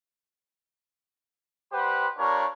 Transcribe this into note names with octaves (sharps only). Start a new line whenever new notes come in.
G3 G4 B4 C5 F#5 C6
G3 D4 F4 A#4 C#5